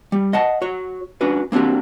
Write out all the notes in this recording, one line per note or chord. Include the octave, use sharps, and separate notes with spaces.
G3
D#5 F#5 A5
F#4 C#5
C#4 D4 F#4 B4
A#3 C4 D4 F#4 G4